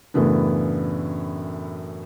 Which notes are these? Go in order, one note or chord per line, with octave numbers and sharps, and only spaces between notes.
F#2 A2 C#3 E3 B3 D4